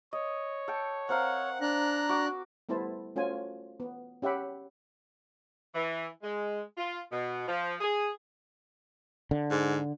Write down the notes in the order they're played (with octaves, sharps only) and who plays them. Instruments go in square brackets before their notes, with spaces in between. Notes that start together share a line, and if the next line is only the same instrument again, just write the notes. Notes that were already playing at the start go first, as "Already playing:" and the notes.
[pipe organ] C#5 [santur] D#5
[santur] A4 G5
[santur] C4 A#4 F5 [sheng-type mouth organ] F#5
[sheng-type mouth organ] D4 F#6 [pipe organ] A#5
[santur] F#4 D6
[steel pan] G3 A3 B3 E4 C5 A5
A3 C#4 F4 F#4 C5 G#5
B3
C#4 G4 E5 F#5 B5
[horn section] E3
G#3
F4
B2
F3
G#4
[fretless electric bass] D3
[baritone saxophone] G#2